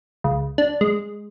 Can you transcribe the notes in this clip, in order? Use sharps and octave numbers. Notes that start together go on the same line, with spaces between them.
C#2
D4
G#3